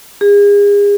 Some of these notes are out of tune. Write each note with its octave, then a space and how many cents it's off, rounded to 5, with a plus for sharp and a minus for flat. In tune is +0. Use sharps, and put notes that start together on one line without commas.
G#4 -35